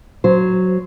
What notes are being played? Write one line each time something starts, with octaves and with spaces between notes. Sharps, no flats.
F#3 C5